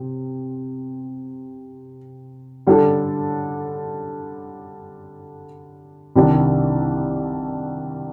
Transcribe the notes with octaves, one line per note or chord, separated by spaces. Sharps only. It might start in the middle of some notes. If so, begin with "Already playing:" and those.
Already playing: C3
D3 G3 D4 A4
C2 C3 D#3 G3 D4